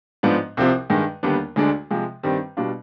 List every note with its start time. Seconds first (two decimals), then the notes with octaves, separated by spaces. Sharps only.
0.23 G#2 F3 B3 D4
0.57 C2 C3 F3 C4
0.90 G2 D#3 G#3
1.23 D#2 D3 G3 B3 D4
1.56 D2 D3 G#3 D4
1.91 C3 F3 G#3
2.23 G2 D#3 G3 C4
2.57 B2 G3 D4 F4